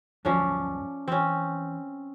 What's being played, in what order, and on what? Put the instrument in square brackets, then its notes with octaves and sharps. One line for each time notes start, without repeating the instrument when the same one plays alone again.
[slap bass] D2 G2 F#3 [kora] F3 C#4 D4
[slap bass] E3 [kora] C4 C#4